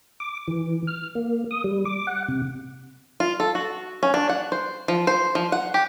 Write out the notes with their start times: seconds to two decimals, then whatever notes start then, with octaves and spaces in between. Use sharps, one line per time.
0.20 D6
0.48 E3
0.87 F6
1.15 A#3
1.51 D#6
1.64 G3
1.85 D6
2.07 F#5
2.28 C3
3.20 F4
3.40 A4
3.55 F#4
4.03 C#4
4.14 D4
4.29 F#5
4.52 C5
4.88 F3
5.07 C5
5.35 F3
5.52 F#5
5.74 G4